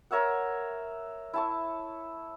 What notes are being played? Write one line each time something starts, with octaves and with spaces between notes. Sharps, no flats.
A#4 C#5 E5 F#5
E4 A5 C#6